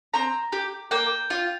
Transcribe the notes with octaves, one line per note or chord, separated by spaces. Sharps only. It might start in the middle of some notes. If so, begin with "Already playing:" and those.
C4 A#5
G4
A#3 G5
F4